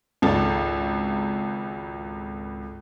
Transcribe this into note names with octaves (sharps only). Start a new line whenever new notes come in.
G#1 C#2 A4 A6